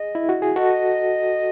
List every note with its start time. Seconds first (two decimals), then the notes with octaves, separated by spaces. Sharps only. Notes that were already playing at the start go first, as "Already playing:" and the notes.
Already playing: G#4 D#5
0.15 E4
0.29 F#4
0.42 G#4
0.56 F#4 A4 D#5